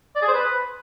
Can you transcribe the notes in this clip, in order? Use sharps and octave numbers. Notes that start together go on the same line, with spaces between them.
D5
G#4
C5
B4